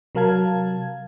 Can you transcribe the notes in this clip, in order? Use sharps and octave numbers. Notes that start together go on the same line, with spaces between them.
C3 F#3 A#4 F5 A5 G#6